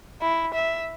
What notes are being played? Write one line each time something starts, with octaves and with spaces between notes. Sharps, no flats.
E4
E5